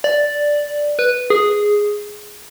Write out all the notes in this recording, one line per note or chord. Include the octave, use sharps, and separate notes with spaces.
D5
B4
G#4